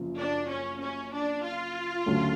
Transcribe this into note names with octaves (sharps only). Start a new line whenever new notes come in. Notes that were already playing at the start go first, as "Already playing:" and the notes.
Already playing: F#1 F#2 F3
D4
C#4
C#4
D4
F4
D2 C#3 F#3 A3